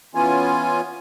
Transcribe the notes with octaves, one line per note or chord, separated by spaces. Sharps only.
E3 B3 C#4 F4 G#5